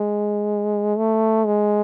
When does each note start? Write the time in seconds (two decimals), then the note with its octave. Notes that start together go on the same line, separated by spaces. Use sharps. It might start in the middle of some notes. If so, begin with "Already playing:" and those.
Already playing: G#3
0.97 A3
1.46 G#3